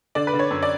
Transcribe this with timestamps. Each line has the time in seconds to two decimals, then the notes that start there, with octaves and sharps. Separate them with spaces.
0.15 D3 D5
0.27 B4
0.34 D3
0.39 C#5
0.51 F#2
0.62 D5